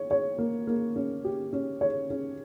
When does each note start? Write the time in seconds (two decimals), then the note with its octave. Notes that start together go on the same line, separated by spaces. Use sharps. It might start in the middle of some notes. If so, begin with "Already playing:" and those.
Already playing: C#5
0.11 C#5
0.38 A#3
0.67 A#3
0.96 C#4
1.24 G4
1.53 C#4
1.81 C#5
2.10 C#4